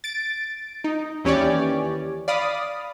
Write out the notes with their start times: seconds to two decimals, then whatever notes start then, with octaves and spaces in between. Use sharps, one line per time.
0.04 A6 D7
0.84 D#4
1.24 D#2 E3 C#4 G4 C#5 D5
2.28 D5 F5 B5 D#6